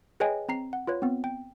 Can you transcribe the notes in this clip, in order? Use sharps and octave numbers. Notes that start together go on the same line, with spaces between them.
G#4 B4 C#5 D#5 G5 G#5
C4 A#5 C7
F#5
F4 B4 C#5
B3 C4
G5